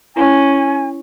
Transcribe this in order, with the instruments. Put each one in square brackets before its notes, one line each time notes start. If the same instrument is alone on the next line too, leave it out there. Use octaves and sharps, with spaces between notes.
[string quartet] C#4 [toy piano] E4 [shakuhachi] G#5